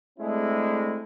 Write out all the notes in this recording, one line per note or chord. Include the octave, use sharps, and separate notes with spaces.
G#3 A3 C4 D4 E4